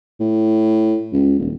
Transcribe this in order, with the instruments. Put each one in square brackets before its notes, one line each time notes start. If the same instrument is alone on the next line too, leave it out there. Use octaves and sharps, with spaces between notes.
[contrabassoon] A2
C#2
D#1